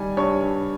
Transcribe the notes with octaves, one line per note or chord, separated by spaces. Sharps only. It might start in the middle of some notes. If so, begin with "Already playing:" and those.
Already playing: D#3 G3 G#5
G2 C#5
G2